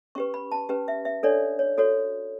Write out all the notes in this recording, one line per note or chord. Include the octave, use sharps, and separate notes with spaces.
C#4 G4 B4 C#6
B5
A5
C#4 G4 B4
E5
E5
D4 A4 C#5 D5
C#5
F#4 A4 C#5